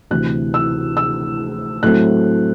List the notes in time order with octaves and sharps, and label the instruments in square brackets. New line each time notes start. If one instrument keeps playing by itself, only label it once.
[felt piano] D2 C3 E3 F#6
E6
E6
A2 F#3 A3 C4 F#6